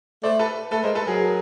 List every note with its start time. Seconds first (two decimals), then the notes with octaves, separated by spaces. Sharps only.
0.23 A3 C5 D5
0.39 A4 B4
0.71 A3 A4 B4
0.84 G#3 A#4 C5
0.95 A4 B4
1.07 F#3 G#4 A#4